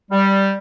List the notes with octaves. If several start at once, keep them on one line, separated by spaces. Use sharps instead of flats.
G3